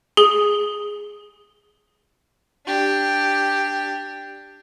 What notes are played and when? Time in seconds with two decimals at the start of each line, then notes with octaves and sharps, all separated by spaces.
0.17 G#4 G7
2.66 D4 G4